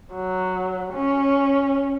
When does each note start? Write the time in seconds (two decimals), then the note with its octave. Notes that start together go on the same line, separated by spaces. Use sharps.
0.14 F#3
0.93 C#4